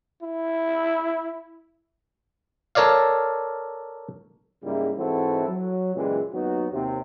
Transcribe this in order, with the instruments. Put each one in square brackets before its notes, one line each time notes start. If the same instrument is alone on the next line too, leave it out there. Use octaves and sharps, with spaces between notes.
[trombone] E4
[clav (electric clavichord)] A4 A#4 C#5 D5 F5
[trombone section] G#2 C#3 G3 A#3 E4
G#2 E3 C4 E4 F#4 A4
F#3
C#2 F#2 A#2 E3 G3 G#3
D#2 F#3 B3 D#4 F#4
D#2 C3